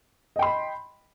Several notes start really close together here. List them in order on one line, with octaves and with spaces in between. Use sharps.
D#5 G5 C6 B5